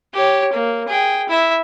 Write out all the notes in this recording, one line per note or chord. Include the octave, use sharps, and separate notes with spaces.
G4 C#5
A#3
G#4 G5
E4 E5